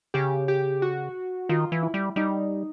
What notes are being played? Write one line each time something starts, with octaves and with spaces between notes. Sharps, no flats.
C#3 G4
G4
F#4
D#3 F4
E3
E4
G3
G3 D#4